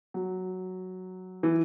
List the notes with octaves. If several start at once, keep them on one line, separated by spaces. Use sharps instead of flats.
F#3
E3